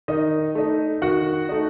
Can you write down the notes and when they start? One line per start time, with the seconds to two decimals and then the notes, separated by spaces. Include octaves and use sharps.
0.08 D#3 D#4 D#5
0.55 A3 D#4
1.02 D#3 F#4 F#5
1.49 A3 D#4